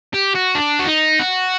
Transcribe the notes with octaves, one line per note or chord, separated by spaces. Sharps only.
G4
F#4
D4
F#4
D#4
F#4